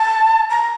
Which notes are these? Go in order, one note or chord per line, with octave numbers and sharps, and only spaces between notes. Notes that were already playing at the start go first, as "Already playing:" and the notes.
Already playing: A5
A#5